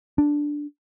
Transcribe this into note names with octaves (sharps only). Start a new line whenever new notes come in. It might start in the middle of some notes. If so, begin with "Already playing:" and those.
D4